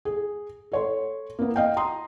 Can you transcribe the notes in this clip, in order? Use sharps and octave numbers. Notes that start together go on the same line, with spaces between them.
G#4
A4 C#5 C6
A#3 B3
D#5 F5 G5
A#5 C6 D#6